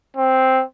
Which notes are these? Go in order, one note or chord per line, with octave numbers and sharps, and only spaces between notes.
C4